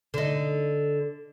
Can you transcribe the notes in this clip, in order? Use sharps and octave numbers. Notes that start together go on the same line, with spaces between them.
D3 D#4